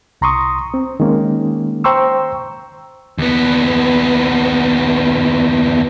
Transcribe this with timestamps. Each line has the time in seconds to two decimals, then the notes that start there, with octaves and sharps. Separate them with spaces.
0.21 C2 A#5 C6 C#6 D#6
0.74 C4
1.00 D#3 G#3 A#3 C#4
1.84 C5 G5 A#5 C6 C#6 E6
3.18 D#2 B3